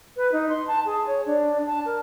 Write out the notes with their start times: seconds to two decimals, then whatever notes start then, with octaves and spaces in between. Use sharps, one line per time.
0.17 B4
0.32 D#4
0.49 C6
0.68 A5
0.86 G#4
1.07 C#5
1.26 D4
1.67 A5
1.85 A#4